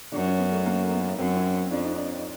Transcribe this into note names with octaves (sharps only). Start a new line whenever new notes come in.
F#2 D4
C#4
B3
A3
A#3
B3
F#2 C4
C#4
F2 D4
D#4
D4